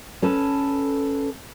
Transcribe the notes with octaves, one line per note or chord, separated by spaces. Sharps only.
C#4 A4 B4